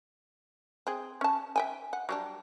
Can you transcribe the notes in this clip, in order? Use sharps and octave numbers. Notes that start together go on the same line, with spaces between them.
C4 G#4
C#4 A5
E5 G5 G#5
F#5
F#3 G3 D4